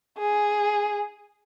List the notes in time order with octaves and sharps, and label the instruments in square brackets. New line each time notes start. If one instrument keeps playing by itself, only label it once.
[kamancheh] G#4